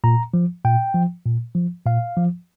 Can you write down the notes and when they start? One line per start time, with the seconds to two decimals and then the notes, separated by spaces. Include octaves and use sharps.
0.04 A#2 A#5
0.34 F3
0.64 A#2 G5
0.94 F3
1.26 A#2
1.55 F3
1.86 A#2 F5
2.17 F3